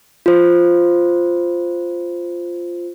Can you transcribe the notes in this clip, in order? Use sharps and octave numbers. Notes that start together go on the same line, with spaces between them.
F4 C5